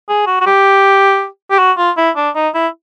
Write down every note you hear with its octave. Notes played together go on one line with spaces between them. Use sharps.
G#4
F#4
F#4
G4
G4
F#4
F4
E4
D4
D#4
E4